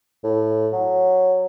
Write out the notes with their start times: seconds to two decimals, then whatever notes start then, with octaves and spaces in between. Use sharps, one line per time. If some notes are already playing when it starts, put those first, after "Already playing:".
0.24 A2
0.73 F#3